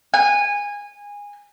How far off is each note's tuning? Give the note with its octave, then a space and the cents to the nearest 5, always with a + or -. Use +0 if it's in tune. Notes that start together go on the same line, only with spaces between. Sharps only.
G#5 -20